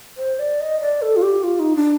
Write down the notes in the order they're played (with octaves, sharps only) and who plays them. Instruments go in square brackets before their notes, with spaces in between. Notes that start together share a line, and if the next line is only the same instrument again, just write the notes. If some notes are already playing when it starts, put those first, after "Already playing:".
[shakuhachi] C5
D5
D#5
D5
A4
F4
G4
F4
D#4
D4